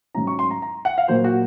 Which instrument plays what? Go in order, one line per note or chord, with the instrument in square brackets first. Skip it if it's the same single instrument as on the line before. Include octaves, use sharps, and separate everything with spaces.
[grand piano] G#2 F#3 C#4 A#5
C#6
C6
A#5
A#5
F#5
F5
A#2 F#3 A#3 C5
F#4